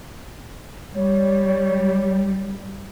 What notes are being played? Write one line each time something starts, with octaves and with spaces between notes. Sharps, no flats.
G3 C#5